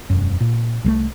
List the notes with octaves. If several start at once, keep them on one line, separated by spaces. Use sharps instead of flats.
E1 F#2
A#2
C2 F3 A3